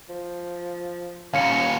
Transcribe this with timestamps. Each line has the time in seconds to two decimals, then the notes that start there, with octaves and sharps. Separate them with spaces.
0.10 F3
1.34 D#2 A#2 C#4 F5 C#7